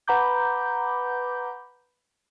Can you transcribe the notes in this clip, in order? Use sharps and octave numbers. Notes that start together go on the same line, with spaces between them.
B4 F#5 A#5 B5 D6 G6